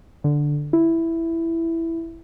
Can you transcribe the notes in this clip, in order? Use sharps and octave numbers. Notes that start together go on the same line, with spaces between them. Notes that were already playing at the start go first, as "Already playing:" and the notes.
D3
E4